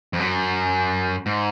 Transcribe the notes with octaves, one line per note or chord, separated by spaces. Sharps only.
F2
F#2
G#2